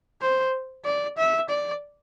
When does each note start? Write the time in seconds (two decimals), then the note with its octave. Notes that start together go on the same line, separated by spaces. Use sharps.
0.22 C5
0.85 D5
1.18 E5
1.49 D5